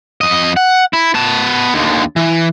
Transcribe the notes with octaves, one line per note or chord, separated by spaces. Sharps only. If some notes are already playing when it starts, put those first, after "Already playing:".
F2 D#5
F#5
E4
B3 A5
D#2 D3
E3